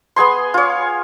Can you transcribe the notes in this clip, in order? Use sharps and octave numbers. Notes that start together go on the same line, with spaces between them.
B3 G#4 G#5 C6
F4 C#5